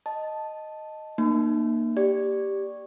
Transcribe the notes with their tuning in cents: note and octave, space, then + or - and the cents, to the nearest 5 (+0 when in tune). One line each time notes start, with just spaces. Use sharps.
D#5 +0 A5 +0
A#3 +0 D#4 -40
G4 +0 D5 +0